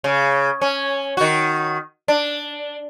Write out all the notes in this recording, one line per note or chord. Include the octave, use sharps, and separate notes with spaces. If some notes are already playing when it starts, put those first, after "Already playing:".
C#3
C#4
D#3 F#4
D4